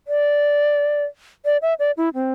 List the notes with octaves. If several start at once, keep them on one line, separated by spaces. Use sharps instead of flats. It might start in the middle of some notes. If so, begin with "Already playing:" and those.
D5
D5
E5
D5
E4
C4